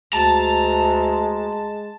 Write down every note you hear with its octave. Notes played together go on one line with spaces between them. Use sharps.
D2 G#3 A5 A#5